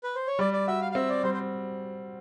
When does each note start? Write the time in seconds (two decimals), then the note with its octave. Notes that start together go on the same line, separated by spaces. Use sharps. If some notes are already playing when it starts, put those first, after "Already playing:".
0.04 B4
0.15 C5
0.27 C#5
0.39 G3 D5
0.53 D5
0.67 F#4 E5
0.81 F5
0.92 F5
0.95 C4 E5
1.09 D5
1.23 G3 C5
1.34 C5